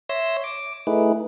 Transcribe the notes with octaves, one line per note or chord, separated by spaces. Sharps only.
C#5 E5 C6 E6 A#6
D6
A3 D#4 E4 G#4 B4